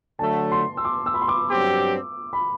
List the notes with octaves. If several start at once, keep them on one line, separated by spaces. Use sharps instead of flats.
D3 F#3 A3 A5
C6
E6
D6
E6
B5
C6
D6
G2 F#3 C4 G4
B5